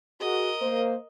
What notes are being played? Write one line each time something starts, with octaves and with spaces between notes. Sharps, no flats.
F#4 G#4 A#4 D#5
A#3 C5